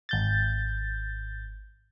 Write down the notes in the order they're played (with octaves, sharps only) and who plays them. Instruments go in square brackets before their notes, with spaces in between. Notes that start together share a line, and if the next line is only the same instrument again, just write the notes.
[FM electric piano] G#1 G6 A6